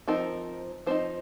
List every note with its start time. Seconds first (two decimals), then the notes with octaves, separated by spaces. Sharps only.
0.08 F3 C4 D#4 A#4
0.87 F3 C4 D#4 C5